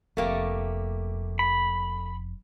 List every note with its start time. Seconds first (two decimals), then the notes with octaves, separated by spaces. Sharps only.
0.17 F1 F2 A3 A#3 G4
1.39 B5